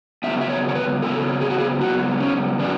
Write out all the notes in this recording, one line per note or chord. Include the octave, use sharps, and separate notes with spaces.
C#3 F#3 B3 E5
E5
C#5
C#5
B4
C#3 F#3 B3 A4
G#4
F#4
G#4
C#3 F#3 B3 F#4
C#4
C#3 F#3 B3 D4